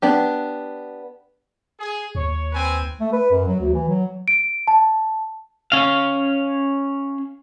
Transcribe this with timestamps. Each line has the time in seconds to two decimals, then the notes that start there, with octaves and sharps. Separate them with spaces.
0.02 B3 D4 G4
1.79 G#4
2.15 D#2 C#5
2.53 C4 B4 G#5
3.00 A3
3.13 B4
3.31 F#2
3.47 F#3
3.60 D2
3.74 E3
3.89 F#3
4.28 D7
4.68 A5
5.72 C#4 F5